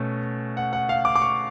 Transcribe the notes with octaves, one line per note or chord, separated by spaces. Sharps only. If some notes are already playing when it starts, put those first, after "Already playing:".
Already playing: B2 A3 C#4
F#5
F#5
F5
D6
D6
C#6